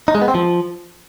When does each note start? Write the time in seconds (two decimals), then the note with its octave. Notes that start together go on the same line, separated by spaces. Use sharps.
0.08 D#4
0.15 G#3
0.21 B3
0.28 C4
0.35 F3